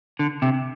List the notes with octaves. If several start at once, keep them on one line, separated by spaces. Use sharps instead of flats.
D3
C3